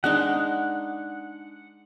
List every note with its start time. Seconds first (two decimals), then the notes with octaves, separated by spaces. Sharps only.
0.04 G#3 D4 D#4 F#5